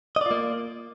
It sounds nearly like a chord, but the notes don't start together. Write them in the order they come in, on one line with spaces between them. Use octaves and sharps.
D#5 D5 F4 A#3